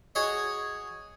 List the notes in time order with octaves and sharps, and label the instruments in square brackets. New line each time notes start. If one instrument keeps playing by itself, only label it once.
[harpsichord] F#4 G#4 C#5 D#5